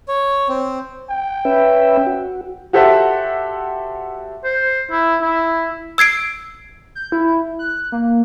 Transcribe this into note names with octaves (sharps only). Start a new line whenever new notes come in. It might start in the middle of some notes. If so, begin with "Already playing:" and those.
C#5
C4
G5
C#4 B4 E5
F#4
F#4 G4 A4 C5 E5 F#5
C5
E4
E4
E6 G#6 C7 D7
G6
E4
F#6
A#3